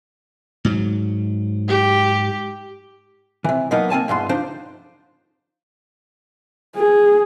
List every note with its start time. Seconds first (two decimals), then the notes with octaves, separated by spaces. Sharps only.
0.65 G#2 F#3
1.68 G4
3.44 C3 E3
3.71 B2 F#3 A#3 B3 D#4
3.90 A#3 C4 G#5 A5
4.08 E2 G2 B2 C6
4.29 F3 D4 D#4 C5
6.75 G#4